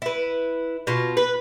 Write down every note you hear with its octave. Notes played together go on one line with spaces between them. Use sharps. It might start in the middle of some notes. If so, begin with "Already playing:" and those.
E4 B4
B2 F4
B4